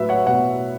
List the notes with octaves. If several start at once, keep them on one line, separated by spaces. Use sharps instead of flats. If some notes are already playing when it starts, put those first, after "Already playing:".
Already playing: A2 F#3 B4 E5
C#5 F#5
B2 C#5 F#5